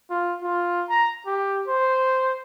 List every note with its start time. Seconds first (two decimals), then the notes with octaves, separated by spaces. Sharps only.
0.10 F4
0.42 F4
0.89 A#5
1.26 G4
1.68 C5